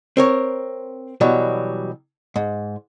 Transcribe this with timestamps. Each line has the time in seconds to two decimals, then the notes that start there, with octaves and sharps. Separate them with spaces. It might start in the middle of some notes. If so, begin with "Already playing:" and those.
0.17 C4 A#4 C#5
1.21 B2 E3 F#3 G3
2.36 G#2